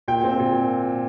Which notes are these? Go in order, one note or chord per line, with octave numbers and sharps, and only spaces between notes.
A#2 G5
C4
A#2